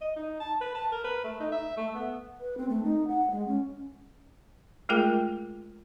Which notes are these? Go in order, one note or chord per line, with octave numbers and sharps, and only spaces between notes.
D#5
D#4
A5
B4
A5
A#4
B4
A3
D#4
E5
A3
B3
B4
C4
A3
D#4
F#5
G#3
C#4
G#3 A3 F4 G#4 A#4 G5